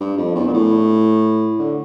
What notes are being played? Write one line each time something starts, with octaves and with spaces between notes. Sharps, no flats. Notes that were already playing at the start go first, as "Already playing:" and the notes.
G2
F2
E2
A#2
A2
D3